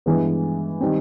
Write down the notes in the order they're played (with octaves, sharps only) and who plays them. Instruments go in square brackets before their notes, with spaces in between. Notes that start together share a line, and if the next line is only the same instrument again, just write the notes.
[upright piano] G2 E3 G#3 B3
D#3 G3 C4